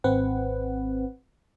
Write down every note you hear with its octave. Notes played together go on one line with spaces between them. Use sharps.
G#1 C4 B4 F#5